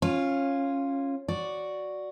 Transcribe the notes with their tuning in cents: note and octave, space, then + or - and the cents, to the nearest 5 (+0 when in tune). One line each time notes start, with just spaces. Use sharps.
C#4 -15 F4 +0
F#4 +0 D5 +0